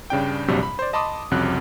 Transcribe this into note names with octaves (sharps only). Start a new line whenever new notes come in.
G2 C#3 D4 G5
A#1 G2 C3 F#3 G3
B5
C5 D5
D#5 A5 B5 C6 D6 D#6
C2 F2 C#3 F#3 F#6